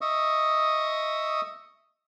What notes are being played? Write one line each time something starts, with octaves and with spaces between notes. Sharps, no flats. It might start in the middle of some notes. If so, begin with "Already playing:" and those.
D#5 E5 C#6 D#6